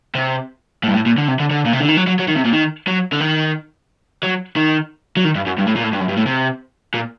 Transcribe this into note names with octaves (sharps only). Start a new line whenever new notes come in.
C3
A2
G2
A2
A#2
D3
C3
D3
D3
A#2
C3
D3
D#3
F#3
F#3
F#3
D#3
C3
A#2
D#3
F#3
D3
D#3
F#3
D#3
F#3
D#3
G2
F#2
G2
A2
A#2
A2
G2
F#2
G2
A2
C3
A#2